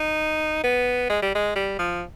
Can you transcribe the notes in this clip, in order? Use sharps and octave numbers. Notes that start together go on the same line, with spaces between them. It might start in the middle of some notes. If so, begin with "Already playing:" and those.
Already playing: D#4
B3
G#3
G3
G#3
G3
F3